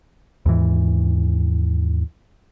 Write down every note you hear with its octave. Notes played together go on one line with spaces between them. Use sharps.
D#2 G#2 E3